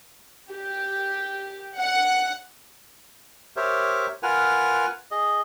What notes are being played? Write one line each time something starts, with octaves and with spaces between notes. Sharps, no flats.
G4
F#5
G4 A#4 C5 C#5 E5
F4 A#4 B4 F#5 G#5 F6
G#4 D#5